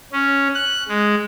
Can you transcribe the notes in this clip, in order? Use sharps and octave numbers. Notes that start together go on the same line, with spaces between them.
C#4
F#6
G#3